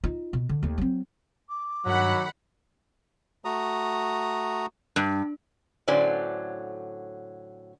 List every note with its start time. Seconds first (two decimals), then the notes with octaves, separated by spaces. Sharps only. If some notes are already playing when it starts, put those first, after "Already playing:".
0.04 D#4 F4
0.33 B2
0.49 D3
0.63 D#2 A3
0.78 F#3 C4
1.49 D6
1.86 G2 D#3 F#3 F#5 B5
3.45 A3 F#4 A#5 D#6
4.96 G2
5.88 A2 D3 F#3 C#4 C5 D5